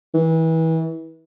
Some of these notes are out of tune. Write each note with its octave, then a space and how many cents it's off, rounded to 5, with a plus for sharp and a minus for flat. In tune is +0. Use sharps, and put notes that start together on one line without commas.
E3 -30